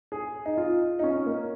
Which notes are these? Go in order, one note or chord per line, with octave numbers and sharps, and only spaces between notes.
G#4
D#4
F4
D#4
C#4
A#3